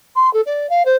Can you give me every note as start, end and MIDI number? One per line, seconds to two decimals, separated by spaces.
0.15 0.32 84
0.33 0.41 69
0.46 0.69 74
0.69 0.83 77
0.85 0.96 72